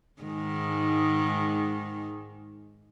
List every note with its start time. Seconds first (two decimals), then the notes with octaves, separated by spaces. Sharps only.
0.22 G#2 D#3 G#3